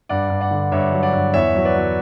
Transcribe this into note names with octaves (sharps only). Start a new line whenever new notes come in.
G2 D5 F#5
G2
D5 F#5
D3
G2 C#5 E5
F#3
D5 F#5
G2
E2 C#5 E5
F#3
B4 D5
F#3